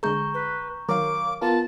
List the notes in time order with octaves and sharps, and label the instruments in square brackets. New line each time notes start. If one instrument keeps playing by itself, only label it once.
[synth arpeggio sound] D3 G#3 G#4 [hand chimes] A#5 C#6 G6
[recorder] B4
[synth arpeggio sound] D#3 F#3 [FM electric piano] A#4 C#5 F5 [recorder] D6
[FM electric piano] B3 F4 A#4 [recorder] A5